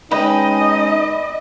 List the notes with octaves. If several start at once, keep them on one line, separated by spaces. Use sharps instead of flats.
G#3 C#4 D#4 B4 D#5 G5